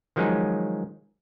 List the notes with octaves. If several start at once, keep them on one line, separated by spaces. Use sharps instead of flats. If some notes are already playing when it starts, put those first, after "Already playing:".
D#3 F3 F#3 G#3 C#4 D#4